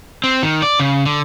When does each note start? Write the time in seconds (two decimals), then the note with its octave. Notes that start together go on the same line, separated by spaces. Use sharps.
0.24 C4
0.43 D#3
0.62 D5
0.79 C#3
1.05 D3